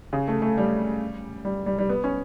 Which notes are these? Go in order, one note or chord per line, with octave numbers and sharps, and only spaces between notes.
C#3
A3
A3
G3
G3
G3
G3
B3
C#4